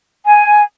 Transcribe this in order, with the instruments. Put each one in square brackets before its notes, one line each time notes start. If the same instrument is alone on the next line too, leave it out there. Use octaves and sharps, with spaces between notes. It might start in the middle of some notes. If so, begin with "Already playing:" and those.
[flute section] G#5